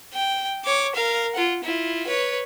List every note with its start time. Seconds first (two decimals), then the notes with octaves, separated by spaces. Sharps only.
0.14 G5
0.65 C#5 D6
0.95 A#4 F5
1.35 F4 F#5
1.64 E4 F4
2.07 B4 C#5